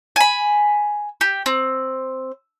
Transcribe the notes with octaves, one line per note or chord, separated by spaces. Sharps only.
G#5 B5
G4
C4